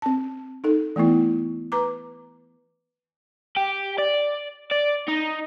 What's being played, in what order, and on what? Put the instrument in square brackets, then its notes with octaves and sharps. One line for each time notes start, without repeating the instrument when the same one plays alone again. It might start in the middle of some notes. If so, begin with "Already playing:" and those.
[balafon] C4 A5
D#4 A4
E3 A3 B3 E4
B4 A#5 D6
[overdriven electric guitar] G4
D5
D5
D#4